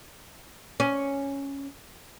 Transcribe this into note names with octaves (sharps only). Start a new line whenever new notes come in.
C#4